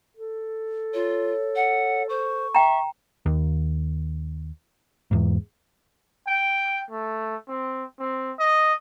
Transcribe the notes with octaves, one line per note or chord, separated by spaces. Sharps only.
A4
F4 C#5
F#5
C5 C#6
E5 G5 A#5
D#2
E2 G#2
G5
A3
C4
C4
D#5